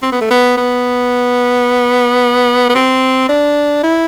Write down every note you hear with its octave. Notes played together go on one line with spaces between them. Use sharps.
C4
B3
A3
B3
B3
B3
C4
D4
E4